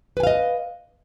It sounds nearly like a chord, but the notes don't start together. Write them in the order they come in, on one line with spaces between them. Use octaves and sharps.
B4 G#5 F5 D#5